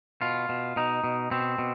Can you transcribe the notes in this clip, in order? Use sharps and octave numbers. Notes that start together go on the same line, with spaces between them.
B2 F4
B2
B2 D#4
B2
B2 C4
B2